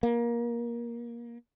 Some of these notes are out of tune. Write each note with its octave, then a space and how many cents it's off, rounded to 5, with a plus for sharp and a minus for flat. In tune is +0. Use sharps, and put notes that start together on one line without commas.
A#3 +20